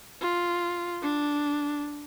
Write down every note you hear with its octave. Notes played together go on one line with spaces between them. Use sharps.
F4
D4